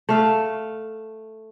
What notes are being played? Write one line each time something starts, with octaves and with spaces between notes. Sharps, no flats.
A3 F5